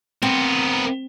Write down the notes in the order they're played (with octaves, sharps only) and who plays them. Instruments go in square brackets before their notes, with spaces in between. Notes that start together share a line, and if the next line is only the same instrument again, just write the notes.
[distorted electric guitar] B3 A#4 [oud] C4